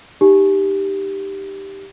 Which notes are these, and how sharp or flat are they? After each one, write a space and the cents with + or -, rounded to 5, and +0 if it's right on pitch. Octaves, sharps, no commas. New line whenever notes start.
D#4 -10 G4 +0